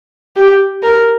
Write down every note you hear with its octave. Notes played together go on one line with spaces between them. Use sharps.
G4
A#4